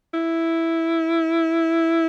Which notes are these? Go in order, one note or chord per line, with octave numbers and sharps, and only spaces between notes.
E4